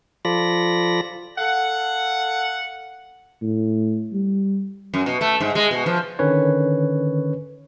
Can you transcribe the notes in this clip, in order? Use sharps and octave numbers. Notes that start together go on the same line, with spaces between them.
F3 F4 A4 D5 B5 A#6
A4 F5 F#5
A2
G3
F#2
B2
A3
G#2
G#3
B2
F3
D3 D#3 C#4 B4 C#5